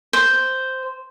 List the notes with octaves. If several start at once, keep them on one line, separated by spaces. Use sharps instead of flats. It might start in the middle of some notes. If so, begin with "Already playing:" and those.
C5